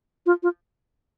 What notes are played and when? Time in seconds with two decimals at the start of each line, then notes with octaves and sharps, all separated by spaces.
0.26 F4
0.43 F4